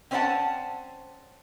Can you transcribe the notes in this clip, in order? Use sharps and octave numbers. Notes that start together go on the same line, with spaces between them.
C4 C#4 C5 D5 F#5 A5